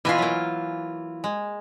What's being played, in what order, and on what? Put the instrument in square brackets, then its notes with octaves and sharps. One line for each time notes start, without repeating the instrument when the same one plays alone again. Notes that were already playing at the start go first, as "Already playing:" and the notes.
[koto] B2 B4 G#5 [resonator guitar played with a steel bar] E3 F4
[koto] F#3 A#3
G#3